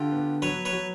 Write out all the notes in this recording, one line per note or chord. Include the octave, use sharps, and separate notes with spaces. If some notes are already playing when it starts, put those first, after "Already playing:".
Already playing: D3 F4 G4
B3
F#3 B4 C#5
B4 C#5
F#3